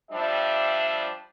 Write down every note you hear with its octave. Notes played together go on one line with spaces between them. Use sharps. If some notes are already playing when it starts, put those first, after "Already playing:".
F3 G3 D4 E5